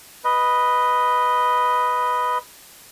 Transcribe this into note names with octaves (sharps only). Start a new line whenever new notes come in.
B4 D#5